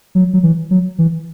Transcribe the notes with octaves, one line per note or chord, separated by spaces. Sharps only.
F#3
F#3
E3
F#3
E3